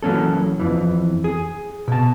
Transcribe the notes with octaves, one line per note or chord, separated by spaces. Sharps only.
E3 F#3 A#3 C#4 A4
F2 E3
G#4
B2 A5